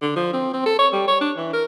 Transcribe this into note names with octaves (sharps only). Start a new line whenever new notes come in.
D3
F3
C4
C4
A4
C#5
G3
C#5
D4
E3
A#4